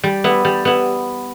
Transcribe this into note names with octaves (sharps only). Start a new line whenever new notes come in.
G3
B3 E4
G3
B3 E4